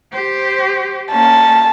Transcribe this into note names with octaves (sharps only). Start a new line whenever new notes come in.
G4 C5
A#3 C#4 A5